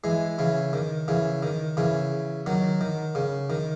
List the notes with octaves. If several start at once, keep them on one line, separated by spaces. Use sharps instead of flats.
E3 G#3
C#3 E3
D#3
C#3 E3
D#3
C#3 E3
D#3 F#3
D#3
C#3
D#3